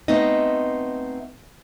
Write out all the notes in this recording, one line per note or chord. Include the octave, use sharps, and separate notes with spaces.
A3 B3 C4 D#4 D#5